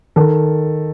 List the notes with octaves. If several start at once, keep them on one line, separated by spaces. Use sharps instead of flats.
D#3 A4